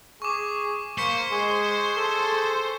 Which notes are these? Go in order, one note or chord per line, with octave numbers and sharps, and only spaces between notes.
G#4 C#6 D6
A#3 C5 C#6 B6 C#7
G#3 G#4
A4